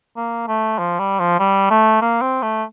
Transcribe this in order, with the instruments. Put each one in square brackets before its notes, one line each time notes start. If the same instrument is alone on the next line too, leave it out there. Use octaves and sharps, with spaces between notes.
[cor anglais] A#3
A3
F3
G3
F3
G3
A3
A#3
C4
A3